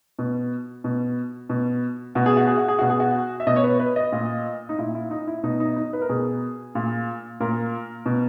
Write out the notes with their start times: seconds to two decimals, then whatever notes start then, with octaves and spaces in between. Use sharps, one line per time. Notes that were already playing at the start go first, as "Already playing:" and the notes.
0.19 B2
0.84 B2
1.50 B2
2.15 B2 F#4
2.26 G#4
2.37 F#4
2.47 G#4
2.57 F#4
2.68 G#4
2.79 B2 F#4
2.90 G#4
3.00 F#4
3.40 E5
3.47 B2 D#5
3.56 C#5
3.64 B4
3.80 B4
3.96 D#5
4.12 A#2
4.69 D#4
4.78 A#2 E4
4.95 E4
5.11 D#4
5.27 E4
5.43 B2 D#4
5.60 D#4
5.76 D#4
5.93 B4
6.01 A#4
6.09 B2 G#4
6.75 A#2
7.40 A#2 A#4
8.06 B2